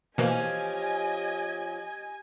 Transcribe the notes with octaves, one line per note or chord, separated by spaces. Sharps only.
B2 E3 F3 A#3 C#4 G4 D#5 G#5